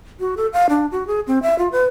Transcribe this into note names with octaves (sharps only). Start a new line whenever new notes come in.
F#4
A4
F5
D4
F#4
G#4
C4
E5
F4
B4